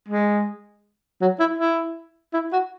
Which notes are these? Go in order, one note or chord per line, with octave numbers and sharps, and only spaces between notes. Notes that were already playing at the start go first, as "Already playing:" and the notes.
G#3
F#3
E4
E4
E4
F#4